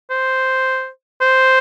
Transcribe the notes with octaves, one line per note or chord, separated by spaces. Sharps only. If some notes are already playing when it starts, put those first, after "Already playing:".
C5
C5